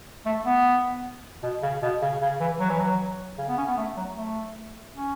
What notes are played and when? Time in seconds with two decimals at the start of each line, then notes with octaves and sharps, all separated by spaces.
0.26 A3
0.46 B3
1.43 B2
1.63 C#3
1.82 B2
2.02 C#3
2.22 C#3
2.40 E3
2.60 F#3
2.69 E3
2.79 F#3
3.38 C#3
3.48 B3
3.58 C#4
3.68 B3
3.77 A3
3.97 F#3
4.17 A3
4.95 C#4